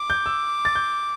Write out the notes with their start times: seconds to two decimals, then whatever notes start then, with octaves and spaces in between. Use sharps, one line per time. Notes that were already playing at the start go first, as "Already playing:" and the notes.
Already playing: D6
0.10 G6
0.26 E6
0.65 A6
0.75 G6